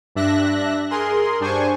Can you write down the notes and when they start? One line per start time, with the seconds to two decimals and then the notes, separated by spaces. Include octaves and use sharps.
0.15 G2 D4 E5 F#6 A#6
0.91 G#4 A#4 C6
1.40 G2 D4 C5 G#5 C#6